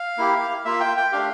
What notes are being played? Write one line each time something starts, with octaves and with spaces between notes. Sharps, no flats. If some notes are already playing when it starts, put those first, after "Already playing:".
Already playing: F5
A#3 E4 G4
A#3 F4 E5
G5
G5
A3 D4 G4 F5